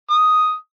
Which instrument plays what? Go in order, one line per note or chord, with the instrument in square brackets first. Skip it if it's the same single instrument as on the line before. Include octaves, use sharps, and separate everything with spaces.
[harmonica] D#6